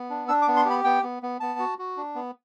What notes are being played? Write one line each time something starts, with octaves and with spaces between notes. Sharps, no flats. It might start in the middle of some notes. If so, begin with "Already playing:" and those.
Already playing: B3
D4
D4 E6
D6
B3
C6
G4 B5
B3 G5
B3
B3
B3 A5
F#4
F#4
D4
B3